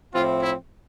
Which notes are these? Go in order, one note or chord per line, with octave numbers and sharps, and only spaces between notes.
A2 F3 C4 E4 F4
E4